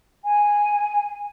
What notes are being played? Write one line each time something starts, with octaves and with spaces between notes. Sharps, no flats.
G#5